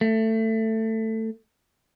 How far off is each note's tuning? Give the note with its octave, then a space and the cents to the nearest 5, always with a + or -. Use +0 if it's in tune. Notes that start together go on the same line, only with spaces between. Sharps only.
A3 +15